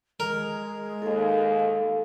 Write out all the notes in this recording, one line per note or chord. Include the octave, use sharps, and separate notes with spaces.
G#3 A#4
D#2 A4 F5